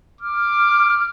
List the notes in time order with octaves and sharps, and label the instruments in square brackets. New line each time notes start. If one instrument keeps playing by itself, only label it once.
[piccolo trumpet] D6 [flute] F6